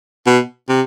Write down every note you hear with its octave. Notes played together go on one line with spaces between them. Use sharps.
B2
C3